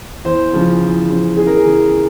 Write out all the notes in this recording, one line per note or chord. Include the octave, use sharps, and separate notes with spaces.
E2 C5
C#3 F3
E2
C#3 F3
E2 G#4
A#4
G#4
C#3 E3